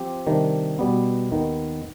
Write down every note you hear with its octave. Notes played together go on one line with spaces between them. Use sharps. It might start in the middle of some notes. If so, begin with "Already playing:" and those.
Already playing: F3 C4 G4
C3 D#3 G3 D4
B2 G3 B3
D#2 D#3 B3